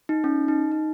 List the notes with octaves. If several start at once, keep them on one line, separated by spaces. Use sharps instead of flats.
D#4
C#4
D#4
D#4